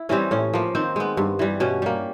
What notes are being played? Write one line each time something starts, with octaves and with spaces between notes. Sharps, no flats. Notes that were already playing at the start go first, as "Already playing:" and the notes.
Already playing: E4
E3 G3 C4 C#4
A2 C#4
F3 A#3
D#3 C4
G#3 B3
G2
E3 G3
B2 C#4
G3 A#3